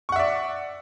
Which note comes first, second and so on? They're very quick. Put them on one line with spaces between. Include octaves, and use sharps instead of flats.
C#6 F#5 E5 D5